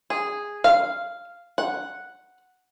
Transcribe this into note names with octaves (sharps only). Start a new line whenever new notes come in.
G#4
F5
F#5